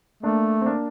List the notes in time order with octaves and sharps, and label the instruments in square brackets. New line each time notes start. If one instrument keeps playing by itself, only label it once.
[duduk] A3 [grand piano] A#3 D4
[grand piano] C4
A#3 D4